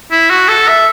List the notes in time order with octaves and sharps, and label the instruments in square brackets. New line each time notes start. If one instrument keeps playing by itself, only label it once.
[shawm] E4
F#4
A4
E5